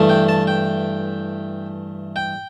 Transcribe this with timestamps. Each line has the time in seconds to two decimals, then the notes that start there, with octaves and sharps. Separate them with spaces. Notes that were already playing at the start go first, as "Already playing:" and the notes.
Already playing: G2 E3 A3
0.09 G5
0.29 A5
0.47 G5
2.16 G5